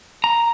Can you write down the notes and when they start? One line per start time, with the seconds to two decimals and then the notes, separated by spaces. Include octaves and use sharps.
0.24 A#5